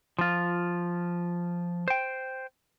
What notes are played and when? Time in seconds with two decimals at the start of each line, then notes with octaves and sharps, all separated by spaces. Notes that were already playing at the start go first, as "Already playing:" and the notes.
0.19 F3 F4
1.88 C5 G5